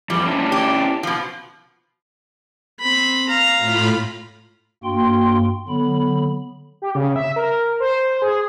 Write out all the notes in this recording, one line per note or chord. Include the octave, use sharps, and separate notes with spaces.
E2 F3 G3
C#4 D4 E4
G4
B2 F3
C4 B5
F5 A#5
A2 F4 B5
G2 A#3 F#4 G5 C6
D3 F#3 B3 B5
G4
C#3
E5
A#4
C5
G#4